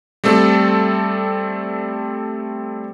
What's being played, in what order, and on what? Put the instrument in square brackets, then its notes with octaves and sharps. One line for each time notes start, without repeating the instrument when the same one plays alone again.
[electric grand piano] G3 A3 C4 A4